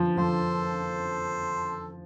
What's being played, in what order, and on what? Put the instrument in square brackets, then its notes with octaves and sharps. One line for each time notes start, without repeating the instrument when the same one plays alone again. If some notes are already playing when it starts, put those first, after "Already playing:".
Already playing: [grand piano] F3
[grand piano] F3 [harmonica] A4 C5